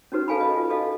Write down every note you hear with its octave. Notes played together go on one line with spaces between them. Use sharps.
C#4 D#4 F#4 B4
A4 F5 G#5 A5 B5
D#5
F4
F#4 A4 D#5 F5